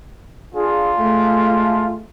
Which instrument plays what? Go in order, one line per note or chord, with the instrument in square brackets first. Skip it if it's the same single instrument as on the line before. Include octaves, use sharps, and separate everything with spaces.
[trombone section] D4 G#4 [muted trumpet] F4
[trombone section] G#3 A3